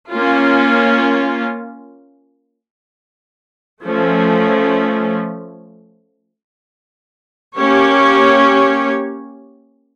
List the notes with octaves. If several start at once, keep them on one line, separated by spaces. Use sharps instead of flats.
A#3 C#4 F4
F3 A3 C#4
A#3 C#4 G4 C#5